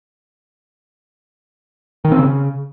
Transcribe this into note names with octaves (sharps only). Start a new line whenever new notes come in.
D#3
C4
C#3